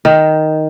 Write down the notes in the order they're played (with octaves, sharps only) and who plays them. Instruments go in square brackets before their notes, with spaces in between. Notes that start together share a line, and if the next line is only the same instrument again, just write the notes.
[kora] D#3